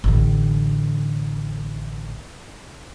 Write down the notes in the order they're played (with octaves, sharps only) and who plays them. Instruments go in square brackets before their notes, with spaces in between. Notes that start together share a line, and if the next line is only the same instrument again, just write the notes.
[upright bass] A1 D3